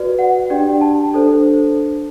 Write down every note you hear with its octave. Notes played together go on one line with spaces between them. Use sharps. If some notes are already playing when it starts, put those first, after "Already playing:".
Already playing: F#4 B4 D5
F#5
D4 G4 D5 G5
A5
D4 A4 C5